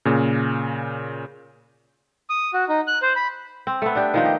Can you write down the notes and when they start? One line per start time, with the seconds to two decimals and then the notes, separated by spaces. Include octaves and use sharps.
0.05 A#2 C#3
2.30 D#6
2.54 F#4
2.69 D#4
2.87 F#6
3.02 C5
3.16 B5
3.67 C4
3.82 A3 B3
3.95 D4 G4
4.14 D#3 F3 D#4
4.25 G4